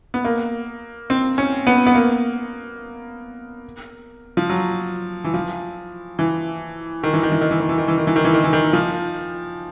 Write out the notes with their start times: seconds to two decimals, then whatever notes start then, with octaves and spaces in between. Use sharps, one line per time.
0.14 B3
0.25 A#3
1.10 C4
1.38 C#4
1.67 B3
1.86 B3
1.95 A#3
4.37 F3
4.50 F#3
5.24 E3
5.34 F3
6.19 E3
7.04 D#3
7.13 E3
7.23 D#3
7.32 E3
7.41 D#3
7.51 E3
7.60 D#3
7.69 E3
7.78 D#3
7.88 E3
7.98 D#3
8.07 E3
8.16 D#3
8.25 E3
8.34 D#3
8.44 E3
8.53 D#3
8.73 F3